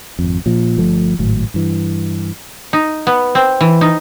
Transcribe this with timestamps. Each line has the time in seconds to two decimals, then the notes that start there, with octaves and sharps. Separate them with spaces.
0.19 G#1 F2
0.46 A#2 F3
0.77 G1 F3 A3
1.19 G#1 A2 F#3
1.54 G2 E3
2.73 D#4
3.07 B3
3.35 C4
3.61 E3
3.81 D#4